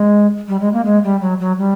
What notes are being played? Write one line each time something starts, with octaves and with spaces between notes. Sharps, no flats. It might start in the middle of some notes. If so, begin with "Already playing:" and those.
Already playing: G#3
G3
G#3
A#3
G#3
G3
F#3
F#3
G3